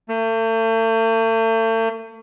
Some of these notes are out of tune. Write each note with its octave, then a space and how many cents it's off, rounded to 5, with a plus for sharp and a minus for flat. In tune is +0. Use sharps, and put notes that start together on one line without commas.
A3 +40